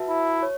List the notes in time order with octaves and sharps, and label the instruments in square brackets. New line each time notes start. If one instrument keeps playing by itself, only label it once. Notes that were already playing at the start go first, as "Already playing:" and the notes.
Already playing: [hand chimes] F#4 B4 E5 A5
[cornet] E4
[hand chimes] C#5